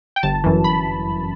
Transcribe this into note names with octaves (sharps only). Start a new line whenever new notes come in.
G5
G1 A5
F#2 E3
B5